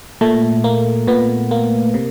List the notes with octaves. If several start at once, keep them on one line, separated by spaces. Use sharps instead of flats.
A#2 A3
A#3
A#2 B3
A#3
C3